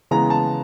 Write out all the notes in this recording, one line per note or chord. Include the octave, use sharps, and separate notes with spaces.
C#3 E3 G#3 B3 A#5
A5